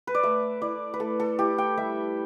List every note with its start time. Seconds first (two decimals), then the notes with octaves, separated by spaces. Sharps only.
0.07 B4
0.14 D5
0.23 A3 E5
0.62 E4 D5
0.94 B4
1.00 A3 A4
1.20 A4
1.39 E4 G4
1.58 G5
1.77 G3 E5